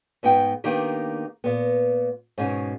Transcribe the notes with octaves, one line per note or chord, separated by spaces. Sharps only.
G#2 B3 D#4 G5
D#3 A#3 B3 D4 D#4 G4
A#2 B3
G#2 B2 C#4 D#4